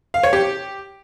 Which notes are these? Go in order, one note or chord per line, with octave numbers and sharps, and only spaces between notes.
F5
C#5
G4